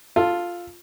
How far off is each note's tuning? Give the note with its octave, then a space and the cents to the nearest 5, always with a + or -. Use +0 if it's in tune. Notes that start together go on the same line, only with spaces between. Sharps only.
F4 +0 A4 +0